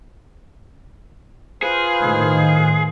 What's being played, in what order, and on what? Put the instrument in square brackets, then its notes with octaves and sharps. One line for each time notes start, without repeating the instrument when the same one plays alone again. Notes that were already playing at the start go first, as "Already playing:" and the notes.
[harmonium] F4 B4 C5 [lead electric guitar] G#4
[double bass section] A2 D#3